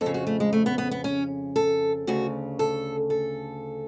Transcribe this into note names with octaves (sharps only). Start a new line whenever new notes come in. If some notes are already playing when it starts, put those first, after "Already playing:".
F2 A4
C#3
F#4
A3
G#3
A3
B3
B3
B3
C#4
A4
D2 C#3 F#4
A4
A4